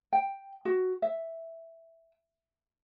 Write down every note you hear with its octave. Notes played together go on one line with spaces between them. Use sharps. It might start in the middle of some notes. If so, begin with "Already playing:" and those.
G5
F#4
E5